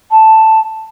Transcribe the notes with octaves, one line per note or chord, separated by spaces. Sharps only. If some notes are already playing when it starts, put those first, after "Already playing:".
A5